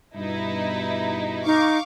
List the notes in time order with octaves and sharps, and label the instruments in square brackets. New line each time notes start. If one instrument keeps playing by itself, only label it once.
[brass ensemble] G2 B2 [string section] D#4 E4
[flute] D#4 [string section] F5 C#6 D6